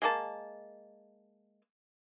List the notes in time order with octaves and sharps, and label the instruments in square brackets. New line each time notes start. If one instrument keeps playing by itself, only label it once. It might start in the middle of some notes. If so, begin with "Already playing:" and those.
[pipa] G#3 A#3 A5